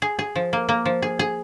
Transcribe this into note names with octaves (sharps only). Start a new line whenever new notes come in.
G#4
G#4
F3
A#3
A#3
F3
G#4
G#4